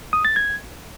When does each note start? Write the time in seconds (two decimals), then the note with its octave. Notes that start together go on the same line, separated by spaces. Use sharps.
0.13 D#6
0.25 A6
0.36 G#6